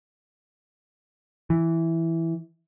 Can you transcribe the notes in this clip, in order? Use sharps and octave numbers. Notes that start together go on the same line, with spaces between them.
E3